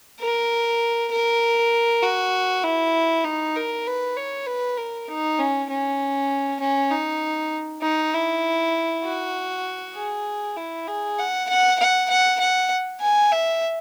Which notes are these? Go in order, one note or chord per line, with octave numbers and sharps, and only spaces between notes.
A#4
A#4
F#4
E4
D#4
A#4
B4
C#5
B4
A#4
D#4
C#4
C#4
C#4
D#4
D#4
E4
F#4
G#4
E4
G#4
F#5
F#5
F#5
F#5
F#5
G#5
E5